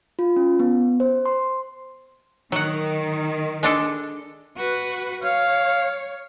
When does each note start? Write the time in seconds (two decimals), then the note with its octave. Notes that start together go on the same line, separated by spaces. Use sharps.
0.19 F4
0.36 C#4
0.59 B3
1.00 C5
1.26 C6
2.52 D#3 F#3 F#5
3.63 G#3 D4 A4
4.57 F#4 B4
5.23 C#5 F5